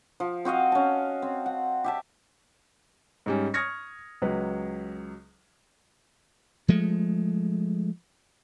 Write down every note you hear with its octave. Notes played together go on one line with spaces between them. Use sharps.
F3
C4 F#4 D#5 F5
C#4 A5
C4
F#5
G4 E5 A5
G#2 G3 C#4
C#6 D#6 F6 G#6 A#6 C#7
C#2 F#3 B4
F3 G#3 A3